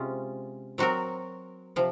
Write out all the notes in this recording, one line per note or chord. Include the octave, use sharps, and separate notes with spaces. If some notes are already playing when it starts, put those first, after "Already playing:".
Already playing: C3 G#3 C#4 F4
F#3 C4 F#4 A#4
C3 F3